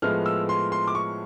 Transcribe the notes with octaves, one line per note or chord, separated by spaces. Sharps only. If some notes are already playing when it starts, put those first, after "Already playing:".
A2 F3 G#3 B3 F6
E6
C6
C6
D6
C#6